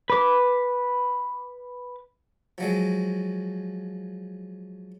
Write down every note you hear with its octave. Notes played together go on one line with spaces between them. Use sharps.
B4 D6
F3 F#3 G#3